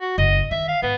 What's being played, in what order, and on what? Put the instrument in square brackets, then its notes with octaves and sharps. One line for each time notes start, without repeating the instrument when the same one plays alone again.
[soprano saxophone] F#4
[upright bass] F#1 [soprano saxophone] D#5
[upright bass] D#3 [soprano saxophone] E5
[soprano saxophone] F5
[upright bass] G#2 [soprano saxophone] B3